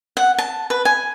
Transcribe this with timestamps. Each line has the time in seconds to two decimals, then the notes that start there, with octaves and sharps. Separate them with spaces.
0.17 F#5
0.38 A5
0.70 B4
0.85 G#5